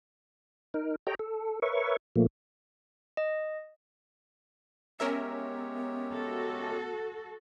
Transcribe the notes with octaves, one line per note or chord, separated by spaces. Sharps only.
D#4 A#4
G4 A4 C#5 D#5 G5 A#5
A4
A#4 B4 C#5 E5 C#6
A#2 F3 A3 A#3
D#5
G#3 B3 C#4 G4 A#4 C#5 E5
F#4 A4